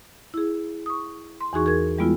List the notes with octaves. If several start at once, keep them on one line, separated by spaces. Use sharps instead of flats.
E4 G#4
C#6 D#6
C6
E2 E3 D#4 F#4 G#4 C#6
G#4 A#4 G#6
E3 G3 G#3 B3 E4 F4